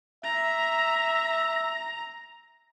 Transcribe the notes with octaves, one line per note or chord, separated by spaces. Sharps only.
E5 A#5